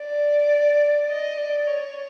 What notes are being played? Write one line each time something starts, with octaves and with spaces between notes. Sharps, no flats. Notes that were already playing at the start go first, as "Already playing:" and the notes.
Already playing: D5
D#5
D5
C#5